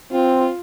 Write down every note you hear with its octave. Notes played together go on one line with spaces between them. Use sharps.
C4 F4